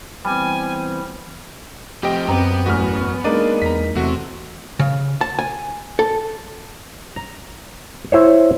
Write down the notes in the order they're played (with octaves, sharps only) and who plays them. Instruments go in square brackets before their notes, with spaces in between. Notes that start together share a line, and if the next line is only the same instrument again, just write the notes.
[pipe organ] E3 B3 C4 [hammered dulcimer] G3 [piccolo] G#5
[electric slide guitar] F3 A3 C4 [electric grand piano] G4 D#5 G5
[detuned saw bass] F#2 [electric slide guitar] B3 [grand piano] C4 A#5
[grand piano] A1 E2 B6 [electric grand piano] F#4 F6
[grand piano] G#3 A#3 D#4 [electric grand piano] D4 D5 D#7
[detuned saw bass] E2 [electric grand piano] A#5 B6
[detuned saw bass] E2 [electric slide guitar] C3 [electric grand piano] A3 F#4
[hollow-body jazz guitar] C#3
A5
G#5
A4
[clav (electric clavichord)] A#5
E4 C5 C#5